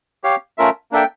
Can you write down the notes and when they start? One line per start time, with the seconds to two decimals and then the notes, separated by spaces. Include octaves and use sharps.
0.24 G4 C#5 F5
0.58 A3 C#4 F4 A#4 E5
0.92 A#3 D4 A4 E5 G5